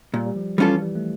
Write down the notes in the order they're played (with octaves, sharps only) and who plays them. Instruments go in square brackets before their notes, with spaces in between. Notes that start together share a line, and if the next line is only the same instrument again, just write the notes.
[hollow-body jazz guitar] A#2 [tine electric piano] G3
[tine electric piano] G3
F3
[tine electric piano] E3 [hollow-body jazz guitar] G3 C#4 F4 A4
[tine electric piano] G3
A3